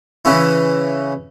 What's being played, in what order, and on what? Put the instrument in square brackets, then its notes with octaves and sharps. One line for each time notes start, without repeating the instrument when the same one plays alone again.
[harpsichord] C#3 E3 C#4 E4